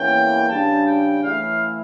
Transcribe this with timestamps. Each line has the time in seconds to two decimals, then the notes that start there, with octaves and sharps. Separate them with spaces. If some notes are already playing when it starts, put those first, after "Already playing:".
Already playing: E2 E3 A#3 C#4 G5
0.49 C#3 G3 D4 A5
0.86 G5
1.23 A2 E3 A3 C#4 E4 F5